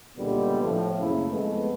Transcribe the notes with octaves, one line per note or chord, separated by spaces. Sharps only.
C#2 A#2 D3 G3 G#3 B3
A2 F3
G#1 F#2 C#3 A3 A#3 E4
F2 G#3 A3 B3